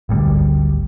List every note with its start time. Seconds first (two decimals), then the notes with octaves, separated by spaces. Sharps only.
0.09 G#1 D2 G3